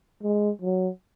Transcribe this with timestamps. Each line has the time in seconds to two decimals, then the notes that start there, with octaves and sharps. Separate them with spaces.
0.24 G#3
0.62 F#3